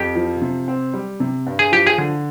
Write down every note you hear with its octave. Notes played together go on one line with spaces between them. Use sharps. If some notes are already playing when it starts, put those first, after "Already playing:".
Already playing: F2 G4
F3
C3
C4
G3
C3
G2
G#4
F3 G4
G#4
D3